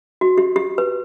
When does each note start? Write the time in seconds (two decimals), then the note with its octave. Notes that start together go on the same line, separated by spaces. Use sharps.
0.21 F#4
0.38 G4
0.56 G4
0.78 B4